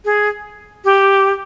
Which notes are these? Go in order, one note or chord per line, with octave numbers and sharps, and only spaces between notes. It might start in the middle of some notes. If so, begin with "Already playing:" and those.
G#4
G4